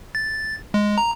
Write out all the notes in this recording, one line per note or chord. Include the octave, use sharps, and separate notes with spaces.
A6
G#3
A#5